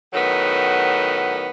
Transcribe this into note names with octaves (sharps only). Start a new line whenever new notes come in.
A2 D#3 F#3 B3